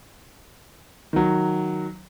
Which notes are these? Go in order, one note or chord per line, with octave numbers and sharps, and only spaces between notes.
D#3 F#3